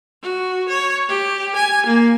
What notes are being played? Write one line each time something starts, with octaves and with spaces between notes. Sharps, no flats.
F#4
C#5
G4
G#5
A#3